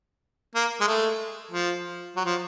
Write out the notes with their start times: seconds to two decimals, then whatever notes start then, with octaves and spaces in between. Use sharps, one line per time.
0.55 A#3
0.81 G#3
0.88 A3
1.51 F3
2.16 F#3
2.25 F3